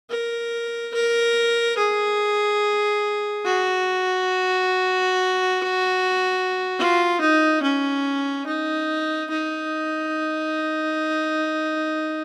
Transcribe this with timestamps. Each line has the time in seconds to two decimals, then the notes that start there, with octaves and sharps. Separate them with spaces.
0.10 A#4
0.94 A#4
1.78 G#4
3.45 F#4
6.79 F4
7.21 D#4
7.63 C#4
8.46 D#4
9.30 D#4